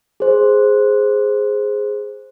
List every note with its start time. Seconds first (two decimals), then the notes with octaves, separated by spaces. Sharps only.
0.20 G#4 C5